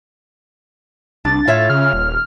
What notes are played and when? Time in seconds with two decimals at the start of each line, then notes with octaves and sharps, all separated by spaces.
1.25 C2 D4 A6
1.48 A2 F4 C#5 E5
1.70 C#3 F6
1.93 D#1